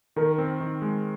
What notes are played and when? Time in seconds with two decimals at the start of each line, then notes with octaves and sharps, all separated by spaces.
0.16 D#3 A#4
0.38 C4
0.61 D#3
0.82 G#3